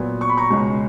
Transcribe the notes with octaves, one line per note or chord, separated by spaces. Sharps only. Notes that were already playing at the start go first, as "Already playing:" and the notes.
Already playing: A#2 F#3 B3
C#6
B5
A#5 C#6
C#2 B2 G#3 C#4